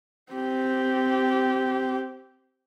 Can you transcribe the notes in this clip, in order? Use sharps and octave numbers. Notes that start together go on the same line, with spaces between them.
C4 G4